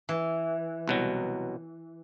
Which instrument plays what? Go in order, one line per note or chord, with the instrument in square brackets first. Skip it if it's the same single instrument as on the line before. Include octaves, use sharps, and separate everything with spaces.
[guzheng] E3
[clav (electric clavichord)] C2 B2 F#3